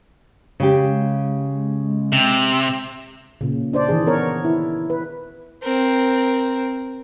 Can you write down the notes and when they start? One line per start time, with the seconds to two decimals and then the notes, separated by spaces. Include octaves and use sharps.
0.60 C#3 G#3 G4
2.12 C3
3.41 A#2 C#3
3.73 D4 C5 D5
3.89 D#3 E3 G#4
4.07 B3 A#4 C#5
4.45 E4
4.90 B4
5.62 C4 A#4